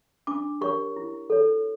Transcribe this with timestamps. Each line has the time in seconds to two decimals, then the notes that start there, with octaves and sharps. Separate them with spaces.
0.27 D4 D6
0.61 G4 A#4 C#5 C#6
0.96 E4
1.30 A4 C#5